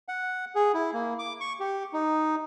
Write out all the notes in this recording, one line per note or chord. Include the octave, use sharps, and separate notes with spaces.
F#5
G#4
E4
A#3
D6
C#6
G4
D#4